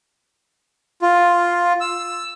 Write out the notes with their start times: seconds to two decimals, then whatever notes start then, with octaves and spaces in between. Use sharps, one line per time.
1.02 F4
1.81 E6